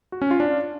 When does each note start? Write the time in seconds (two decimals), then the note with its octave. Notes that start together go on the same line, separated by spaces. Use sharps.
0.12 F#4
0.22 C#4
0.31 F4
0.40 D4